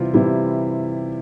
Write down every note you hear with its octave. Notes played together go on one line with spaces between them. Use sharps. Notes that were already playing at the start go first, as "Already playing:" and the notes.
Already playing: C3 E3 G3 F4
C3 E3 G3 E4